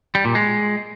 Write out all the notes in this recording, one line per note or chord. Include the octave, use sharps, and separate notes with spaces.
G3
A#2
G#3